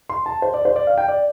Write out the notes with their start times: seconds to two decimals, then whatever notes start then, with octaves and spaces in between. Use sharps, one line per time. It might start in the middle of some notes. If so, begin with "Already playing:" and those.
0.09 C6
0.26 A5
0.42 C5
0.54 D5
0.65 C5
0.76 D5
0.87 F5
0.98 G5
1.09 D5